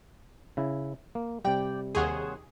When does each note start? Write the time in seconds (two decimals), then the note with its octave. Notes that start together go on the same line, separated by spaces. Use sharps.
0.57 C#3 E4
1.15 A#3
1.45 C3 G3 D5 G5
1.95 D#2 G#4 C5 C#5 F#5